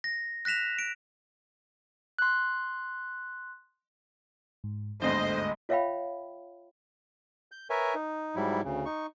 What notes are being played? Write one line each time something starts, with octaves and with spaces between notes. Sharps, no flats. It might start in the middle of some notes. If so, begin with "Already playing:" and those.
A#6
F#6 A#6 B6 E7 F7
D7
C6 F#6
G#2
G1 D2 G#2 D4 C5 D#5
F4 C#5 E5 F5 G5 B5
G6
A#4 B4 C#5 E5 G#5
D#4
G#2 F#3 G3 E4
D2 C#3
D#4 C#6